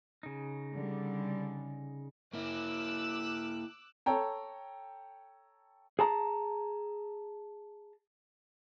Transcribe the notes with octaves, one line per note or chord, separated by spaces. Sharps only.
C#3 D#4
D3 G3
A#3 E4 D6 E6 F#6
A4 C#5 G5 A#5
G#4 A5 A#5